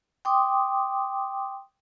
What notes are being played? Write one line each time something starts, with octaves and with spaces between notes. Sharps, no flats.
G5 C6 D6 D#6